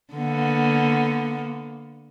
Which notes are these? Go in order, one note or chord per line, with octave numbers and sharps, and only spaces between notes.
D3 A#3 B3